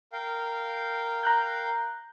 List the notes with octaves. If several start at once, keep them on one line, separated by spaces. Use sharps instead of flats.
A#4 F5 G5
A#5 F#6 G6